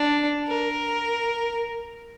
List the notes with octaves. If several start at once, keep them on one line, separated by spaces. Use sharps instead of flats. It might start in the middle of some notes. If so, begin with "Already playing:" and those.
Already playing: D4
A#4